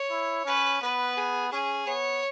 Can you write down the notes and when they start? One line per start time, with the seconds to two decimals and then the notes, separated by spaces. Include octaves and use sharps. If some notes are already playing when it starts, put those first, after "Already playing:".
Already playing: C#5
0.11 E4
0.46 C#4 B4
0.82 B3 B4
1.17 G#4
1.51 C#4 G#4
1.87 B3 C#5